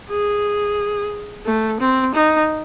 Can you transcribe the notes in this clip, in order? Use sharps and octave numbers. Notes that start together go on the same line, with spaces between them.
G#4
A3
C4
D#4